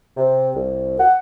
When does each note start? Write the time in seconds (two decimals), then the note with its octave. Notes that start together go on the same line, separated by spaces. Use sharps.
0.17 C3
0.55 C2
0.99 F#5